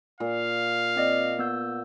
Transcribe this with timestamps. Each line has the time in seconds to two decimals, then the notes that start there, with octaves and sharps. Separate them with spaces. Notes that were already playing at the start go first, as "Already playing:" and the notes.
0.20 A#2 F5
0.96 C4 D5 D#5
1.39 B3 E6 G6